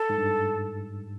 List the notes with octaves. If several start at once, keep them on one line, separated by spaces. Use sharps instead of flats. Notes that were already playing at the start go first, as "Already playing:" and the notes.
Already playing: A4
G#2
G2